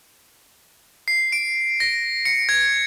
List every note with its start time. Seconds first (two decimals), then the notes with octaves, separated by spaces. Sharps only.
1.08 C7
1.32 D7
1.80 A#6
2.25 C#7
2.49 G#6